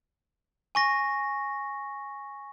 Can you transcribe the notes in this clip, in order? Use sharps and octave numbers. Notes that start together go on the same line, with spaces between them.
G#5 C#6 A#6